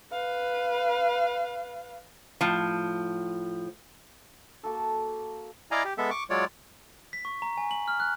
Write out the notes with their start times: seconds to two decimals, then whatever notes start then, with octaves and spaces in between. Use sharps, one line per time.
0.12 B4 F5
2.41 A2 F3
4.63 A#3 F#4 A4
5.71 E4 D5 D#5 F5 G#5 A#5
5.85 G4
5.98 G#3 B3 A4 E5
6.11 C#6 D6
6.30 F#3 G#3 F4 C#5 D5
7.13 B6
7.25 C#6
7.42 A#5
7.58 G#5
7.71 F#7
7.88 F6
8.00 F#6